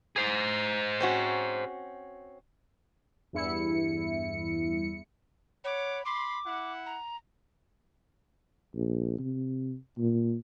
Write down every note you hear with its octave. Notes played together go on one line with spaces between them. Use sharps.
G#4 C5
C4 C#4 F#4
E2 G2 E4 C#7
C#5 F#5 B5 D6
B5 C6 D6
E4 F#5
A#5
A#1
C3
A#2